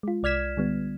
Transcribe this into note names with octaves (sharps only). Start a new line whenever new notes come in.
G#3 F4
C2 D5 F6 G#6 B6 E7
D3 G3 B3